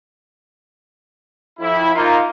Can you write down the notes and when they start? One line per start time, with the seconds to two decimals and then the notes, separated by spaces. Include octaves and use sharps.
1.60 F2 E4
1.95 A#3 D#4 F4